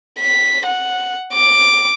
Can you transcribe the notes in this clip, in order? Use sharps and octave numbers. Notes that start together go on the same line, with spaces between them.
B6
F#5
D6